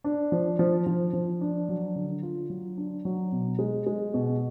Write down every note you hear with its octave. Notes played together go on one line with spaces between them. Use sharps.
D4
F3
F3
F3
F3
D4
F#3
D3
F4
F#3
D4
F#3
B2
G#3
G#3
B2